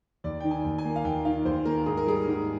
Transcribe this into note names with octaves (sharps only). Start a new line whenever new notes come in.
D#2 D5
D#3 G5
G#5
D#2
G#5
A#3
F5
D#2 G5
D#3 F5
D#2 C5
A#3 A#4
G#2 G#4
A#4
G3 G#4
G#2